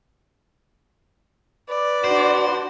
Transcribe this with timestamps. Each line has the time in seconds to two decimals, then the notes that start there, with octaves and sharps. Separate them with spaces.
1.70 B4 D5
2.04 D4 F#4 C5